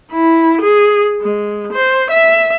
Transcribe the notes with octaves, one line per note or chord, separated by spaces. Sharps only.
E4
G#4
G#3
C5
E5